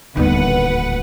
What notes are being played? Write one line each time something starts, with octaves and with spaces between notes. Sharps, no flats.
D#1 A1 D2 G3 B3 D#4 B4 F#5